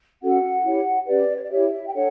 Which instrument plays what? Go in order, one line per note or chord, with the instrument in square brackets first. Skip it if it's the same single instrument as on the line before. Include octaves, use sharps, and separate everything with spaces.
[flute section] C#4 F#4 A4 F#5
E4 G4 C#5
C#4 G4 B4 D5
C#5
D5
E4 G4 C#5 E5
G5
D4 A4 C#5 F#5